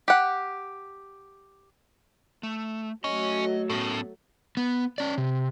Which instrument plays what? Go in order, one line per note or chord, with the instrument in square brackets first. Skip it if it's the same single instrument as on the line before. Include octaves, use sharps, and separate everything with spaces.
[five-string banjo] G4 F#5
[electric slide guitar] A3
[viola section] F#3 A3 [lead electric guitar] C#4 [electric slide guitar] D#5
[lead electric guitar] A2 [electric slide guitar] B3 C#4 A4
[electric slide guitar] B3
C#4 D5
C3